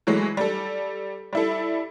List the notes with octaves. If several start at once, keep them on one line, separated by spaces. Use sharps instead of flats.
E3 F#3 G#3 A3
G3 A4
G3 E4 A4